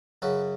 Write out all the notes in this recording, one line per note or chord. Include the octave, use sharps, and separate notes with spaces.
F#2 C#3 F#3 B4